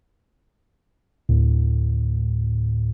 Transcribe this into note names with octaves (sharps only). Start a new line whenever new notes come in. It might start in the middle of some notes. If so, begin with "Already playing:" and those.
D2 A2